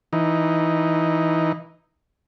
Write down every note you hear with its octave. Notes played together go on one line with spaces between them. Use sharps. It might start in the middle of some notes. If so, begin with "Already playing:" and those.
E3 D#4